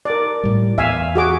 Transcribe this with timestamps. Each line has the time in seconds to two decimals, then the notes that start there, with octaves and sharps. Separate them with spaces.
0.05 A#4 D5
0.43 A2 G3
0.78 E2 E5 F5 G#5
1.15 F#4 G#4 D6